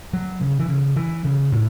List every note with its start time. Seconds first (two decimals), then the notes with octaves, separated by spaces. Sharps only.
0.13 F#3
0.41 C#3
0.60 E3
0.68 C#3
0.96 E3
1.25 C#3
1.52 A2